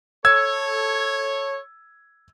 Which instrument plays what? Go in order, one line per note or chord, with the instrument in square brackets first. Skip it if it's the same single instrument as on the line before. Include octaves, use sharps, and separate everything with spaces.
[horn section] A4 C#5 [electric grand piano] E6 G#6